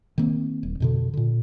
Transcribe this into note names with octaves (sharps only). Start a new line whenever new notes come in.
D#3 A#3 C4
D#1
F2 B2 D3
A#2 D3